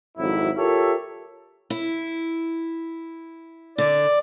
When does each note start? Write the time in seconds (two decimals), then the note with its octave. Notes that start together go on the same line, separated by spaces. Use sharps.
0.18 G#1 F2 F#3 E4
0.57 F4 G4 A4 A#4 C#5 E5
1.70 E4
3.78 D3 D5